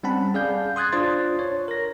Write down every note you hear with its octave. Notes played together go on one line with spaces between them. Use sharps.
G3 C4 C#4 F#5 A5 B5
G#4 D5 F5 G6
C6 D#6 F#6 G#6 A6
D4 F4 C5 D5 C6 A6
C#5
A#4 A#6